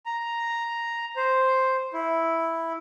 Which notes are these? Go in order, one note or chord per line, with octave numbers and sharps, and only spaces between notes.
A#5
C5
E4